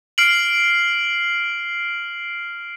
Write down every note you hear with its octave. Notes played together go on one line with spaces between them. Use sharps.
F6 C7 D7 F#7